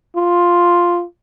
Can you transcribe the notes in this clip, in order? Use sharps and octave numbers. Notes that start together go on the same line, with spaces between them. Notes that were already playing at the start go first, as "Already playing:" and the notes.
F4